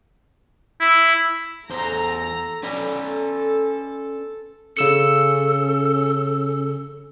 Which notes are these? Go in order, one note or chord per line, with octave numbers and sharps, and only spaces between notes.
E4
E2 A4 C5 A#5
C#4 A4 B4 D5
C#3 C#4 A4 E6 C#7